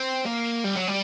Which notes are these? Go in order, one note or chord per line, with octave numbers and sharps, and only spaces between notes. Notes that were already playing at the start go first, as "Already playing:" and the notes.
Already playing: C4
A#3
G3
F#3
G3